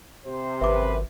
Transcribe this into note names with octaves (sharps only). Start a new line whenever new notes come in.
C3 C5
G#1 F#2 B4 E5 D6